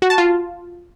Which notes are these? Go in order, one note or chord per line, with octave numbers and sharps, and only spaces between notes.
F#4
A5
F4